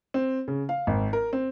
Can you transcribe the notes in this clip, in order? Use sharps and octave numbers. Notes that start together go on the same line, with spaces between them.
C4
C#3
F5
G#1
A#4
C4